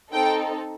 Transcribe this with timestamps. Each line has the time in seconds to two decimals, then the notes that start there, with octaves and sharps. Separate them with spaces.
0.12 C4 D#4 A4 G5